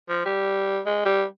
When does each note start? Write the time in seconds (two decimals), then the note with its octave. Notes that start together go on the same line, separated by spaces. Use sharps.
0.09 F3
0.25 G3
0.86 G#3
1.05 G3